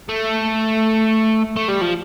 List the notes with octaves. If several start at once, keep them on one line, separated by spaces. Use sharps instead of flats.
A3
A3
G3
F3